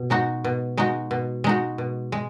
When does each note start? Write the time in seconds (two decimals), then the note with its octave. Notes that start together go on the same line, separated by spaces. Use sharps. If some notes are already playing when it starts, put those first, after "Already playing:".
Already playing: B2
0.10 G#3 D#4 F#4
0.44 B2
0.77 G#3 D#4 F#4
1.11 B2
1.44 G#3 D#4 F#4
1.78 B2
2.12 G#3